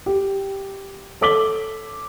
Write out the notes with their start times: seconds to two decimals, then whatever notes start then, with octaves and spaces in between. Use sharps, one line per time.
0.06 G4
1.21 A4 C#5 D6 B6 F#7 G7